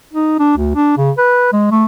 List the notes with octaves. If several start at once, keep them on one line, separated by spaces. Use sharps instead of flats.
D#4
D4
D2
D4
C#3
B4
G#3
A3